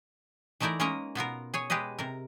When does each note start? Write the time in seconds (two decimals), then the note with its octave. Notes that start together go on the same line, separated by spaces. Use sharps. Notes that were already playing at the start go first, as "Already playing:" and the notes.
0.60 E3 A3 D#4 E4 A#4 D5
0.80 G#3 A#3 C#4 A#4 D#5 A#5
1.15 B2 B3 F4 A#4
1.54 G#4 C#5 G#5
1.70 G#3 G4 G#4 B4 D#5
1.99 C3 A#4